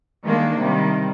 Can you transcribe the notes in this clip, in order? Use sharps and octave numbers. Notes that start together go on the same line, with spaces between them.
D#3 G3 G#3 A#3 D4
C3 D#3 G3